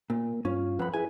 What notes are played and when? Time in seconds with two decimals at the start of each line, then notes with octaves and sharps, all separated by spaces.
0.10 A#2 A#3
0.45 G2 C#4 F4
0.79 F2 B4 F#5 B5
0.94 E4 G#4 B4 G#5